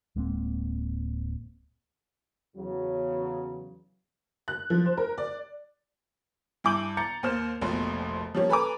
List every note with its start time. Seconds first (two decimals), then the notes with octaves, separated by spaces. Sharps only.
0.16 D1 G#3 A#3 C4
2.56 E2 C#3 F#3
4.48 F#6
4.70 F3
4.86 C5
4.97 A#4
5.18 D5
6.64 G2 E4 G#5 D6 G6 F#7
6.97 A#5 G6 A6 C#7
7.23 D#2 A#3 C5 F6 E7
7.61 F1 A#1 B2 F3 C6
8.35 F3 G3 A#3 C#4 G4 C#5
8.49 A4 B4 G#5 A#5 D6